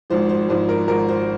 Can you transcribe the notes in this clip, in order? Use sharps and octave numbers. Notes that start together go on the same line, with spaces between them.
G#1 G#2 F3 C5
C5
G#1 G#2 F3 C5
A#4
G#1 G#2 F3 A#4
C5